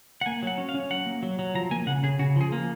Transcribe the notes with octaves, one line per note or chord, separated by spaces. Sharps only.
F#5
A#3 G#5
F#3 F#5
C#4
F5
C#4
F#3 F#5
A#3
F#3
F#3
F3 A#5
A#3 G#5
C#3 F#5
C#3 G#4
C#3 F#4
F3 G#4
A#3